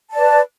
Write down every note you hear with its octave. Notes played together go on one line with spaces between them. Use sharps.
B4 D5 A5